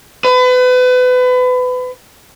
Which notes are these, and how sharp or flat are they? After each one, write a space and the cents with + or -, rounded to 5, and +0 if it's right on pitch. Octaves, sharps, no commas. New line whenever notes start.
B4 +30